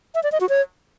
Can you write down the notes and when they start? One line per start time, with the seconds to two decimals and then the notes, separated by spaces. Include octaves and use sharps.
0.15 E5
0.23 D5
0.32 D#5
0.41 F#4
0.49 C#5